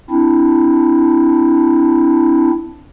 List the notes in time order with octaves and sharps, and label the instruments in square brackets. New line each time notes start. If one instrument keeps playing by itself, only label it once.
[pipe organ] C4 D4 E4